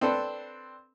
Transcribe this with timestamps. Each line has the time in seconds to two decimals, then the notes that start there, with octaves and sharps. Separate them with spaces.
0.01 C4 D4 A4 B4